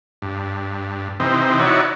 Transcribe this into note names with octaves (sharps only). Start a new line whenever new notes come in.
G2
C3 E3 C4 D#4
D#4 E4 F#4 C#5 D5